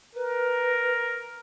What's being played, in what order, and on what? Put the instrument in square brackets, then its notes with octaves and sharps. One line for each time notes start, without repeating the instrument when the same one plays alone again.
[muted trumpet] A#4 [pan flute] B4